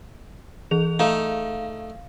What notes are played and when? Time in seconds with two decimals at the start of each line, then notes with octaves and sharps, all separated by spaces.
0.71 E3 G#4 F7
0.99 A3 D#4 F5